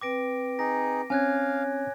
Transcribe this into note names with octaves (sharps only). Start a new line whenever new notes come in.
C4 B4 G5 D6 A#6 D7
D#4 G#4 A#6
C4 C#4 C#5 F5 G#5 F#6 G#6